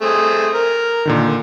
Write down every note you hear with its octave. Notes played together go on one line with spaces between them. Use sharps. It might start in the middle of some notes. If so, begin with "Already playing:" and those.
A3 C4 G#4
A#4
A#2 D3 D#3